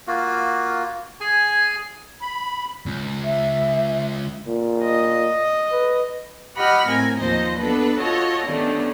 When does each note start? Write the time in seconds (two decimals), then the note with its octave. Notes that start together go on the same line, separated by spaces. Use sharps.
0.07 A#3 F4 F#4
1.21 G#4 G#5
2.21 B5
2.86 C#2
3.24 E5
4.47 A#2
4.82 D#5
5.72 B4
6.56 G4 D#5 F#5 B5 F6
6.88 A2 C4 A#4 G#5
7.20 D#2 F3 D#4 C5 D#5
7.57 B3 D4 A4 B4
7.99 F4 F#4 A4 C#5 D#5
8.47 D#3 G3 A3 B3 C#4 D4